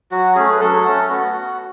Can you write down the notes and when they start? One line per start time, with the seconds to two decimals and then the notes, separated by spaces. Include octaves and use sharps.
0.11 F#3 F#4
0.36 A3 C#4 G#4
0.52 B4
0.60 F#3 A4
0.85 A3 C#4
1.09 B3 F#4
1.33 F#4